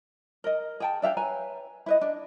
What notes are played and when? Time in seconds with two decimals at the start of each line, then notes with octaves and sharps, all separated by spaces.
0.44 A#4 D#5
0.80 G#4 G5 A5
1.02 D4 E5 F5 G5
1.17 B4 C#5 G#5 A#5
1.86 E4 B4 D#5
2.01 D4